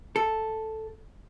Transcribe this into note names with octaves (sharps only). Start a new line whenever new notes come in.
A4